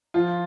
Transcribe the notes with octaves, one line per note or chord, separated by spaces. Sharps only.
F3 F4